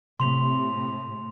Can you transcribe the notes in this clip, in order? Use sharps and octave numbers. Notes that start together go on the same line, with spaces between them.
A2 C3 C6 F7